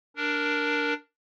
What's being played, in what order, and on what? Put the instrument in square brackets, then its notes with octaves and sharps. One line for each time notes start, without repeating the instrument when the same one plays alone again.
[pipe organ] D4 A#4